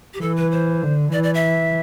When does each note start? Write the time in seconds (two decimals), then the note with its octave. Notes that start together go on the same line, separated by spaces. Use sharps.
0.14 G4
0.21 E3 A4
0.36 B4
0.51 C5
0.82 D3
1.13 E3 D5
1.23 D5
1.34 E5